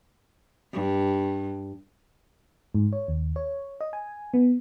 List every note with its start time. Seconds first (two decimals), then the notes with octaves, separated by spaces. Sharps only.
0.73 G2
2.74 G#2
2.93 C#5
3.08 D#2
3.36 C#5
3.81 D#5
3.93 G#5
4.34 B3